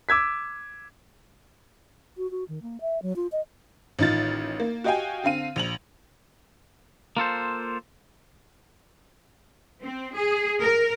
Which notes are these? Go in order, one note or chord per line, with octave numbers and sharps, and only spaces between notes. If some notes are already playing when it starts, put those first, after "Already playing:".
D6 E6 G#6 B6
F#4
F#4
D#3
A#3
E5
F#3
F4
D#5
A1 D#3 D#4 F4 A6
A#3
F#4 G4 D#5 F5 G5 G#5
D3 C4 F5 D#7
A#1 F7 F#7
A#3 F4 A4 C5
C4
G#4
A#4